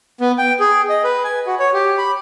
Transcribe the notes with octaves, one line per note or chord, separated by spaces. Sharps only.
B3
G5
G#4
D#5
B4
G#5
F#4
C#5
G4
B5